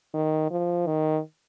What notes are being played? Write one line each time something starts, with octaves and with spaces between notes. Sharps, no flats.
D#3
F3
D#3